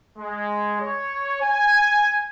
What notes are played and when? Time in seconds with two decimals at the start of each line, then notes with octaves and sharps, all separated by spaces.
0.19 G#3
0.82 C#5
1.42 G#5